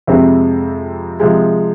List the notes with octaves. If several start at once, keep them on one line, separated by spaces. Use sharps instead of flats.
F2 C3 G#3 C4
C3 F3 G#3